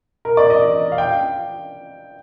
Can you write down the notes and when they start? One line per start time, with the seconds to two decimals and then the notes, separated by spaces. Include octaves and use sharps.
0.25 A#4
0.37 D5
0.50 D#5
0.92 F5
0.98 G5